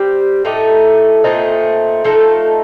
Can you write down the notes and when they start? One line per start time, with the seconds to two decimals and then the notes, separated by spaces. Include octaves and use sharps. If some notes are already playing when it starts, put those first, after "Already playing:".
Already playing: G3 C4 G4
0.45 A2 A3 D#4 G4
1.24 A#2 A3 C4 D#4
2.04 F3 A3 D#4 A4